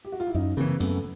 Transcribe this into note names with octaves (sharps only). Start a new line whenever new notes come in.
G4
F#4
F4
E4
F#2 C#4 D#4
C#3 E3 A#3 C4
F#2 A3 B3